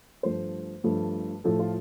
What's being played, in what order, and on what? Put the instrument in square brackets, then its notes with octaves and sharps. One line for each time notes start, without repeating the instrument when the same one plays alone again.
[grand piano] G2 F3 A3 C5
G2 F3 A3
A2 F3 A3 A4
F4